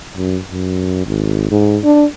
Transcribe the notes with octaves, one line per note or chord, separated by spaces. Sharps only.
F#2
F#2
G#1
G#2
D4